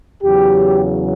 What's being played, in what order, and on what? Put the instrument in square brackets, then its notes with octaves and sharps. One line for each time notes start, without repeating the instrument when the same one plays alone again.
[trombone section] E2 C#3 F#3 G4